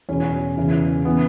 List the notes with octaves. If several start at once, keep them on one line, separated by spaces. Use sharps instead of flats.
E2 B2 C#4
E2 C#3 E3
E3 B3